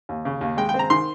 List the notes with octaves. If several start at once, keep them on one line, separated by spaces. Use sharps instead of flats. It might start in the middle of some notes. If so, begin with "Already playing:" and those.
D#2
C#3
D#2
G#3 G5
G5
C4
A#5
D#3 C6